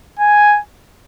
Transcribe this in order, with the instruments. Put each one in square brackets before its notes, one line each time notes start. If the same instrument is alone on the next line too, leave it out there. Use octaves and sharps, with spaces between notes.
[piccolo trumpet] G#5